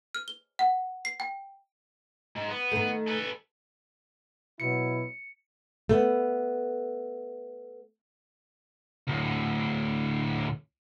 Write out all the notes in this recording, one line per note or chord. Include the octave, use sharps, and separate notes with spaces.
F6
G7
F#5
C7
G5
G#2
B3
D#3 A3
A4 B4
B2 F#3 E4 C#7
A3 B3
D2 A2